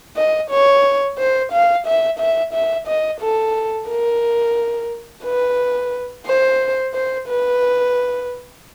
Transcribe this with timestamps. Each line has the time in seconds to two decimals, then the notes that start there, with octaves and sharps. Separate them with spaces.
0.17 D#5
0.50 C#5
1.18 C5
1.52 F5
1.86 E5
2.19 E5
2.53 E5
2.87 D#5
3.21 A4
3.89 A#4
5.24 B4
6.26 C5
6.94 C5
7.28 B4